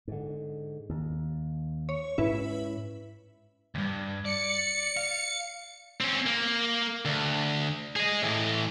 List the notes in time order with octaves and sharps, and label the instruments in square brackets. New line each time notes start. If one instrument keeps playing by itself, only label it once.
[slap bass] G#2 D3
D#2
[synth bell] C#5
[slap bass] G#2 C#4 [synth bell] E4 B4 E5
[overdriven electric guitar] D2 G2
[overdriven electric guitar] D5 [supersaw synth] C#7
[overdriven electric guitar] F5
[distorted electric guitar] C4 C#4
A#3
D2
G#4 D#5
A2 E3